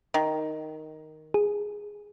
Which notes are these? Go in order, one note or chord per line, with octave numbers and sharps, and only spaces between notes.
D#3
G#4